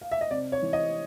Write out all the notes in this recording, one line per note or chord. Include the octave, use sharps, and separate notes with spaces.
F5
E5
D#5
C3 D5
C#5
E3
D#5